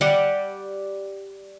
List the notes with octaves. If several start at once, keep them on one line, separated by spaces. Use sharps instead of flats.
G3 G4 F#5